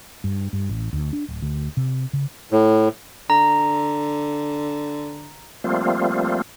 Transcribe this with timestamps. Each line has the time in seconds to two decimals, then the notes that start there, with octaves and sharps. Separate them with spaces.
0.24 G2
0.53 G2
0.69 A1
0.93 D2
1.13 D4
1.28 D1
1.42 D2
1.77 C3
2.13 C#3
2.52 A2
3.30 D3 A#5
5.64 F3 G3 A3 A#3 C4 F4